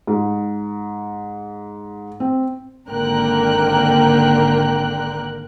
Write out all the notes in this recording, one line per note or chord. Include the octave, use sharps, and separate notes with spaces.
G#2
C4
G#1 D3 A#3 A#4 G5 F#6